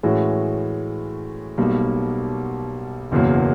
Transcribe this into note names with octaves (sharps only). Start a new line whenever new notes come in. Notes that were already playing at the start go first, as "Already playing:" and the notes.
A2 E3 G#3 C#4 F#4
B1 B2 G3 A#3
F#1 E2 B2 F#3 A#3